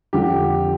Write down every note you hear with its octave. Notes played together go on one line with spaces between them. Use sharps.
F2 D3 F3 G4